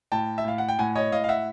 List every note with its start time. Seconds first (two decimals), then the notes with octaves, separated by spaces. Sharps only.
0.12 A2 G5 A5
0.38 E5
0.45 A2 F5
0.58 F#5
0.69 G5
0.79 A2 F#5 G#5
0.95 C#5 D#5
1.12 A2 D#5 F5
1.24 F5
1.29 E5 F#5